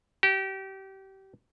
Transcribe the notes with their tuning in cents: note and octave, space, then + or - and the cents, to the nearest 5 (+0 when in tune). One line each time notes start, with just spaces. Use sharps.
G4 -30